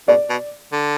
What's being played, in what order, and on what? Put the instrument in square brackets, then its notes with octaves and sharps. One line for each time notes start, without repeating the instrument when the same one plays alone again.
[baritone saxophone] B2 [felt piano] D5
[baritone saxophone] B2
D3